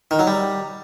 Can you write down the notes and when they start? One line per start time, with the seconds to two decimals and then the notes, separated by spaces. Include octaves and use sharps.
0.11 D#3
0.19 F#3
0.27 G3